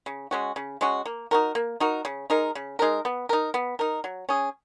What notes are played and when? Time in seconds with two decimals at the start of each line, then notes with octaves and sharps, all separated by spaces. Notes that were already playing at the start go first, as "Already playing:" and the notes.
0.06 C#3
0.31 G#3 C#4 F#4
0.56 C#3
0.81 G#3 C#4 F#4
1.06 A#3
1.31 D#4 F#4 A#4
1.55 A#3
1.80 D#4 F#4 A#4
2.05 C#3
2.30 G#3 D#4 A#4
2.55 C#3
2.79 G#3 D#4 A#4
3.05 B3
3.29 D#4 A#4
3.54 B3
3.79 D#4 A#4
4.04 F#3
4.29 C#4 G#4